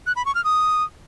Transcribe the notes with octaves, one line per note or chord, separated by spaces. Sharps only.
F#6
B5
C#6
F6
D#6